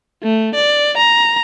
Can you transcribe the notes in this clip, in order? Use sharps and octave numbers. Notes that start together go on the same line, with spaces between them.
A3
D5
A#5